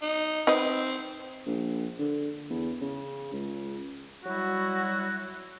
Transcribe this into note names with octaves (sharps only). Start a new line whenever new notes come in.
D#4
C4 D#4 B4 D#5
A#1
D3
E2
C#3
C#2
F#3 G3 E4 F#4